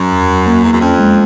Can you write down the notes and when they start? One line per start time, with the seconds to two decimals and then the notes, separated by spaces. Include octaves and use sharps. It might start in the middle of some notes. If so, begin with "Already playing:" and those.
Already playing: F#2 F#3
0.12 E2
0.29 F#3
0.46 A#3
0.64 E2 A#3
0.73 F#2
0.82 F2 C#4
0.99 G#3